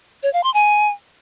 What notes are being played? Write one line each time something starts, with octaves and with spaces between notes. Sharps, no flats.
C#5
F5
C6
G#5